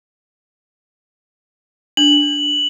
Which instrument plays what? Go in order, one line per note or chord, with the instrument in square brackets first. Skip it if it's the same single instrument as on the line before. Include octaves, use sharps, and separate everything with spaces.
[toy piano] D4 [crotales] F#7